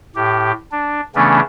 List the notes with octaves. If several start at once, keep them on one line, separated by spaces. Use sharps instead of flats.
A2 G4
D4
C#3 E3 A3 B3 C#4 D4